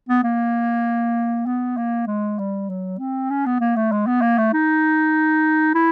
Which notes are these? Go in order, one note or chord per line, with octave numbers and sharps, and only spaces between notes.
B3
A#3
B3
A#3
G#3
G3
F#3
C4
C#4
B3
A#3
A3
G#3
B3
A#3
A3
D#4
E4